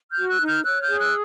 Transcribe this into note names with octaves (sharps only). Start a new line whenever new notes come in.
F#4 F6 G6
E6 F#6
D#4
F6 G6
C#5 E6 F#6
F6 G6
G#4
E6 F#6